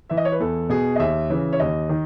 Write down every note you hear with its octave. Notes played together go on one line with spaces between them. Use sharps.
E3 E5
D#5
C#5
B4
E2 A4
B2 G#4
D#5
D#2 E5
C#3 E3
C#5
D#2 D#5
D#3